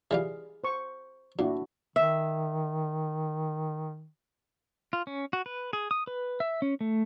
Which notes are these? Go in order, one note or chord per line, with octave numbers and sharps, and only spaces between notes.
E3 G3 F4 G#4 F5
C5 C#6
A#2 D4 E4 F#4
D#3 E5
F4
C#4
F#4
B4
G#4
D#6
B4
E5
C#4
A3